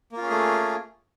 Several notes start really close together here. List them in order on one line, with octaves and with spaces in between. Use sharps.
A#3 F4 C#4 G#4 A3